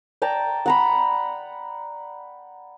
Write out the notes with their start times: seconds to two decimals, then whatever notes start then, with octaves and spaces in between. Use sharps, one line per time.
0.22 D5 G5 A5 A#5
0.66 F#5 A#5 B5